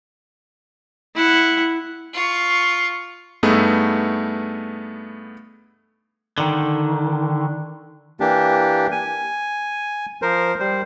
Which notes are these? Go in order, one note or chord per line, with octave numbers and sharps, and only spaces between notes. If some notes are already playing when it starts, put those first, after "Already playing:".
E4 F#5
F4 C#6
G2 A3 B3 D#4 G#4 E6
D3 D#3
E3 A#3 D4 G4
G#5
F3 A#4 C5
G3 C5